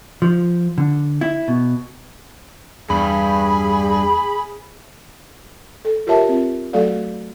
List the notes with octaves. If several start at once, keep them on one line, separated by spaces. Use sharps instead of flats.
F3
D3
E4
B2
E2 G2 G#4 B5
A4
F4 G4 A#4 C#5 E5 A5
C4 F4
F#3 A3 F#4 A4 D5 F5